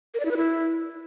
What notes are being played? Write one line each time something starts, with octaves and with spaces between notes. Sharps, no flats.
A#4
D5
E4
B4
E4